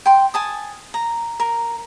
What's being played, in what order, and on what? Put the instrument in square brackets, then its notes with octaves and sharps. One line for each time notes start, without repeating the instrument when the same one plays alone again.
[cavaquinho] G5 C6
G#5 A5 D#6
A#5
A#4